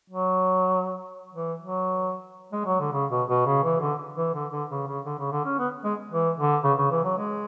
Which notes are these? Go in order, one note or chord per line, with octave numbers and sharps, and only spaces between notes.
F#3
E3
F#3
G#3
F#3
D3
C#3
B2
B2
C#3
E3
D3
E3
D3
D3
C#3
C#3
D3
C#3
D3
C#4
B3
G#3
E3
D3
C#3
C#3
E3
F#3
G#3